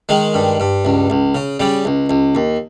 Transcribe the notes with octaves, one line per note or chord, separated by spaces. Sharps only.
D#3 G#3
G2
G2
C#2
C#2
C#3
C#3 G3
C#2
C#2
D#2